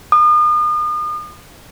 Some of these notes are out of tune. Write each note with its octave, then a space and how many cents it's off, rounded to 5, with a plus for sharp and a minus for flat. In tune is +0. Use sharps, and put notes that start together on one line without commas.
D#6 -40